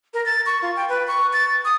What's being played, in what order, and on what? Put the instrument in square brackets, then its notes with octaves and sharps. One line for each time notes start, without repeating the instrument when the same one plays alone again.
[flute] A#4
A6
C#6
F4
G5
B4
C#6
A6
D#6